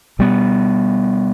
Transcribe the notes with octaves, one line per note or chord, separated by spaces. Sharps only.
B2 G3 B3